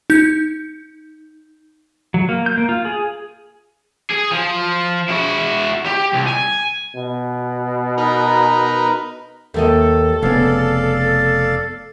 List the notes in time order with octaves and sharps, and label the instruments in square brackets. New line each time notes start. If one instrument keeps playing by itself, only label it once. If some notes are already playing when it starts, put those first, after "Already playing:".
[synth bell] D#4 G6
[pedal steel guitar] F#3
A#3
G6
A#3
F4
G#4
[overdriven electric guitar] G#4
F3
E4 F#4
G4
C2
G#5
[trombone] B2
[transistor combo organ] D#4 A#4 B4
[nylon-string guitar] D#2 A3 D#5 [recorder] A4
[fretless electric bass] F1 B3 [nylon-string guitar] C#3 [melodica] D5 F5